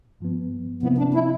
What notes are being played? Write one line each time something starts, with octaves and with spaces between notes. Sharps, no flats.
G2 F3 B3
C3 F3 B3 C4 E4
D4
E4